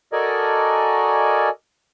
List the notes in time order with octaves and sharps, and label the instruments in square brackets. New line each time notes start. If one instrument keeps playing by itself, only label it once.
[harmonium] F#4 A4 A#4 D5 D#5 G#5